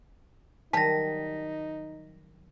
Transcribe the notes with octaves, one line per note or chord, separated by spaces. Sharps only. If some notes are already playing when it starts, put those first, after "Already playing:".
D#3 F#3 G3 D#4 A5 A#6 B6